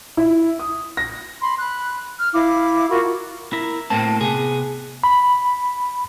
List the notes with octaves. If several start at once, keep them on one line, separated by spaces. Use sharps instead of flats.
E4
D#6
A#6
B5 C6
B5 F#6
F6
E4 F5 D6
F4 F#4 A#4 B5
E4 A#4
A2 A#3 C4 A5
C3 B3 G#4
B5